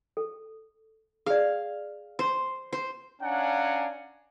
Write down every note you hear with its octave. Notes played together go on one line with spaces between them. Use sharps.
A4
G#4 D5 F5
C5 C6
C5
C#4 D4 F5 F#5 G#5 A#5